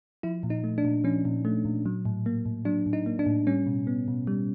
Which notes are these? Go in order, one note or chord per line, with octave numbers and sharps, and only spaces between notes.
F3 E4
A#2
D#4
A3
D4
A#2
F3 C#4
A#2
A3
A#2
F#3
A2
A#3
A2
F#3 D4
A2
D#4
A#3
D4
A2
G3 C#4
B2
B3
B2
G3